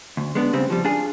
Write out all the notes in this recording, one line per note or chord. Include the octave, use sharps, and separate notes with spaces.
D2
G#3 B3 D4
C#3 G3 C4
F3 G3
D4 F4 G#4